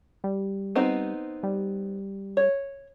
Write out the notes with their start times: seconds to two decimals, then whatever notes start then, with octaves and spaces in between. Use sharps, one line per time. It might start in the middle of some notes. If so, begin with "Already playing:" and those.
0.24 G3
0.75 B3 C4 D#4
1.43 G3
2.37 C#5